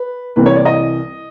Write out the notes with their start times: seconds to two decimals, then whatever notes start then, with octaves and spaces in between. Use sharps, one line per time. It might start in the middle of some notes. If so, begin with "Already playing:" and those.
Already playing: B4
0.36 C2 C3 E3 B4
0.46 C#5
0.56 D5
0.65 D#5